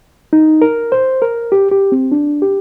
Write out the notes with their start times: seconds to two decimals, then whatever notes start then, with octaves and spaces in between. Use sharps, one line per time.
0.33 D#4
0.62 A#4
0.92 C5
1.22 A#4
1.52 G4
1.71 G4
1.92 C4
2.12 D4
2.42 G4